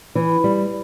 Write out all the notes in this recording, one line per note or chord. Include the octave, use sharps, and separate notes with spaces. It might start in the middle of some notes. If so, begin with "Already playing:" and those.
E3
G3